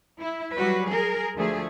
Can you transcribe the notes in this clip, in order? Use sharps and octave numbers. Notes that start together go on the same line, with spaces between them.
E4
F#3 G3 F#4 B4
G#4 A#4
D2 F3 A3 G#4